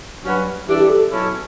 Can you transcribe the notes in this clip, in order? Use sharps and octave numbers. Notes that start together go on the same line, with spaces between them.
G2 F#3 C#4 F#4 B4
E3 G3 D4 G4 A4 E5
G4
A4
B2 F#3 C#4 E4 A4